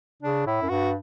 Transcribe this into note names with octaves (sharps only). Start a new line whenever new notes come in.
C#3 D4
A2 E4
F#2
G2 F#4